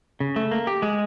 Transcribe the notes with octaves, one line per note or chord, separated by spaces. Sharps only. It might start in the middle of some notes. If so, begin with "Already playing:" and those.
C#3
A3
A#3
G4
G#3